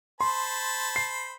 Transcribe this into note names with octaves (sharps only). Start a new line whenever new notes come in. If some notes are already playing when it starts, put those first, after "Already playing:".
C5 A5 B5 C6
C7